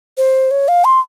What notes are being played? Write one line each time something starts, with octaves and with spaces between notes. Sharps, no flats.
C5
C#5
F5
C6